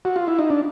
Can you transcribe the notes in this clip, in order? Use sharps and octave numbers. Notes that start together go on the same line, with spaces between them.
F#4
F4
E4
D#4
D4